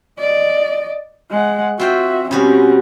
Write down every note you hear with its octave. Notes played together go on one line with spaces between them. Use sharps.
D5 D#5
G#3 F#5
C4 F4 F#4 E5 G5
B2 G3 C4 C#4 F#4